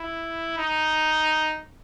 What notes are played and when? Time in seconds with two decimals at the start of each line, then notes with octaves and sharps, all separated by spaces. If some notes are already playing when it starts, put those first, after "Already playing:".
Already playing: E4
0.58 D#4